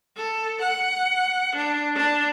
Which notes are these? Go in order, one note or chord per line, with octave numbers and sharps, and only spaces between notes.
A4
F#5
D4
D4